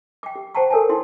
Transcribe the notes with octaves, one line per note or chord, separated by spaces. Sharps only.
G5 D6
G4
C5 F#5 G5 A5 A#5 C#6
A4 A#4 C#5 G#5 A5
D#4 E4 C6